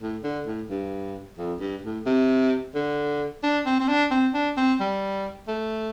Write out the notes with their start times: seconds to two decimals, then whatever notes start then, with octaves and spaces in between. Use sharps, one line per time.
0.01 A2
0.24 D3
0.47 A2
0.70 G2
1.38 F2
1.60 G2
1.84 A2
2.06 C3
2.75 D3
3.43 D4
3.66 C4
3.80 C4
3.88 D4
4.11 C4
4.34 D4
4.57 C4
4.80 G3
5.48 A3